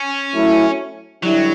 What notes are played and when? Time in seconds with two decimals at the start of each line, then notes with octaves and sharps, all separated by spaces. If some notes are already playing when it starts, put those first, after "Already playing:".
Already playing: C#4
0.34 F#3 A3 E4
1.23 D3 F#3 G3 E4